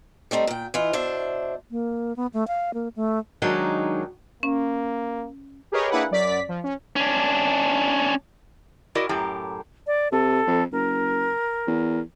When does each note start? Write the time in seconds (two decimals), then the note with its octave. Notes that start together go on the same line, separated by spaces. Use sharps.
0.31 G3 A3 C4 D#4
0.47 A#2 G5
0.74 E3 F4 D#5
0.93 B2 D4 C5 E5
1.71 A#3
2.16 B3
2.33 A3
2.48 F5
2.74 A#3
2.96 A3
3.42 D#3 F#3 G#3 D4 D#4
4.43 A#3 C#4
5.72 G4 G#4 A#4 B4 C#5 D#5
5.91 A#3 D4 E4 G#4 B4 F#5
6.11 F#2 D5 B6
6.49 F3
6.64 C#4
6.96 C#4 D4
8.95 E4 F#4 A#4 D5 D#5
9.09 F#2 A2 G4 A#5
9.87 D5
10.12 C3 A4
10.47 F2
10.72 F#1 A#4
11.67 E2